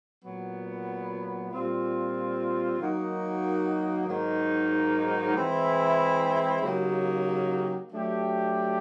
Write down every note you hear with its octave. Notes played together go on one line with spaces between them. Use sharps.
A#2 F#3 B3
A#2 G3 C4 F4
D#3 F#3 A#3 D#4 F#4
G#2 D#3 F#3 A#3 D#4
E3 G#3 C4 E4
C#3 F#3 A#3 D#4 G4
F#3 A3 D4 G4